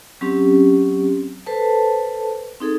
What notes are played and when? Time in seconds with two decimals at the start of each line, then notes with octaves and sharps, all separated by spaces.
0.21 F#3 C4 C#4 G4
1.46 A4 B4 C5 A5
2.61 C4 D#4 G#4 A4